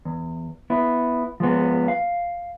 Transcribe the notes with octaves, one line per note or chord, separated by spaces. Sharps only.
E2
B3 E4
F3 G#3 B3
F5